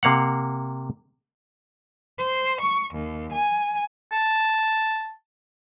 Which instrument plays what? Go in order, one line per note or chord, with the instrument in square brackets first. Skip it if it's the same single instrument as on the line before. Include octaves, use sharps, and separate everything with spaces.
[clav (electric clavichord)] C3 A#3 F5 F#5
[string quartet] C5
C#6
D#2
G#5
[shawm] A5